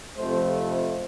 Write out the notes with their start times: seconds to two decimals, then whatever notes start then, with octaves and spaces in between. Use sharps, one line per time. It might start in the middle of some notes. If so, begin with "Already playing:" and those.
0.17 F2 C3 F3 A3 C5
0.54 C5